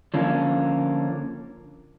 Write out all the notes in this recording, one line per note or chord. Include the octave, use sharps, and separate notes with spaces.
D3 F3 A#3 C#4